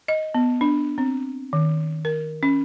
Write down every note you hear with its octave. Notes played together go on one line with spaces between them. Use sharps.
D#5
B3
D4
C4
D#3
A#4
C#4